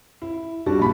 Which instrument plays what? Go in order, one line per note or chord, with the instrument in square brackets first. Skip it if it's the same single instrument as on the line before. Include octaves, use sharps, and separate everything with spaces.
[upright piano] E4
[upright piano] G3 [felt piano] D4 F#4
[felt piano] A#1 B5